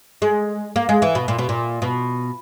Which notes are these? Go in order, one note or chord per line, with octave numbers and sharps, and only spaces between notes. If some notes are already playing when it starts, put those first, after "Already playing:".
G#3
A#3
G#3
E3
B2
A#2
B2
A#2
B2